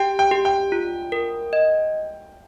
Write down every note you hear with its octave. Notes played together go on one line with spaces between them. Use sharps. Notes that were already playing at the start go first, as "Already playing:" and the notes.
Already playing: G4 G5
G5
G4
G5
F4
A#4
D#5